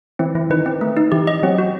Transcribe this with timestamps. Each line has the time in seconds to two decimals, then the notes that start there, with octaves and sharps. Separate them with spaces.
0.19 E3 C4
0.35 E3 E4
0.50 D#3 B4
0.66 C4
0.81 A3
0.97 D#4
1.12 E3 G4
1.27 D#5
1.43 F#3 C4
1.58 F#4